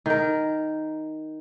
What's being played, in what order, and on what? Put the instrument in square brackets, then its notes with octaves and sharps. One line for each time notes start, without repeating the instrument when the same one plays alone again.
[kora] D#3 A#4